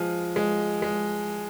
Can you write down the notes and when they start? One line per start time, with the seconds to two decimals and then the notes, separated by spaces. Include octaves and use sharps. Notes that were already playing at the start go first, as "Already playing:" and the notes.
Already playing: F3 G#3
0.36 G#3
0.82 G#3